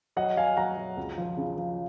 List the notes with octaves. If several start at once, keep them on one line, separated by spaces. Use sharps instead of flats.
F#3 D#5 F#5
F#3 F5 G#5
F#3 F#5 A#5
F#3
C#2
F3
C#3
F3